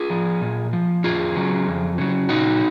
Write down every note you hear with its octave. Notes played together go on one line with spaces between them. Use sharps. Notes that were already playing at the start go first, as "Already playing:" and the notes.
Already playing: F4 G#4
F3
A#2
F3
F2 F4 G#4
C#3 F#3
F2
C#3 F#3
A#2 D#4 F#4